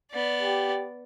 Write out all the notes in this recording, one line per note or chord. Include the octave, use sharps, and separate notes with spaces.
B3 D5
G4